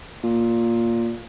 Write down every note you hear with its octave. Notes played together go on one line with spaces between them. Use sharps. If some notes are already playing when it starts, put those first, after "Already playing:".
A#2